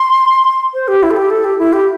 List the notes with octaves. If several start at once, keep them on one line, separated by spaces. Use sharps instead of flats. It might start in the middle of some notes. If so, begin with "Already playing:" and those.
Already playing: C6
C5
G4
E4
A4
G4
A4
G4
E4
G4